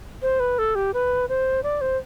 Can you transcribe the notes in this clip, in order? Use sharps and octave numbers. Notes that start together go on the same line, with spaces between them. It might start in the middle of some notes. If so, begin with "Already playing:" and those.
C5
B4
A4
G4
B4
C5
D5
C5